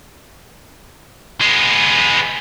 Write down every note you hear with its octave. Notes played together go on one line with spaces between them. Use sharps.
G#3 B3